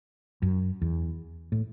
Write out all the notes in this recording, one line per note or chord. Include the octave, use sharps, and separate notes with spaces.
F#2
E2
A2